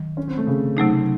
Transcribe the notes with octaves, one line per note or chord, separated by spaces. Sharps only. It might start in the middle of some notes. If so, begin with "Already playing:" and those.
Already playing: D#3 F#3
C#4
C4
A3
C#3
C3 F#3 A3 D#4